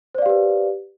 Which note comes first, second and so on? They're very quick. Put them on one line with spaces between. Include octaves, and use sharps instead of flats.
C5 D5 F5 G4 B4